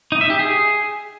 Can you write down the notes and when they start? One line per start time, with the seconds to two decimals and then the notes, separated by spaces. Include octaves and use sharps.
0.12 D#4
0.21 E5
0.30 G4
0.39 G#4